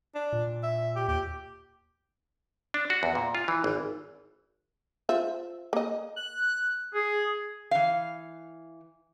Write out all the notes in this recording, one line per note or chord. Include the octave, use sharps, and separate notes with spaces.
D4
A#2
E5
G4
D#2 G4
D4
F#4
E2
A#2
F4
E3
G#1
F4 C5 E5
A#3 D#5
F#6
G#4
E3 F5